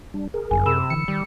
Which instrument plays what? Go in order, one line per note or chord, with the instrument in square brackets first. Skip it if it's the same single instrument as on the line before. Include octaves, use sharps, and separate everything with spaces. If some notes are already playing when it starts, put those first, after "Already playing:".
[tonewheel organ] G3 D4
G#4 A#4
[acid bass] G1 [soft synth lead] F#2 [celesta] G#5
[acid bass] C3 [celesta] B5 E6 E7
[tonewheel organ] D3 E3 [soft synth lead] C#7
[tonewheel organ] D#3 [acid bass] G3